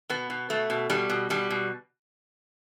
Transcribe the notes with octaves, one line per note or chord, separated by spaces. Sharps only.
B2 B3
B2
B2 A3
B2
B2 G3
B2
B2 G3
B2